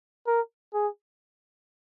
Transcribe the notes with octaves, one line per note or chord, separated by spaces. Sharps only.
A#4
G#4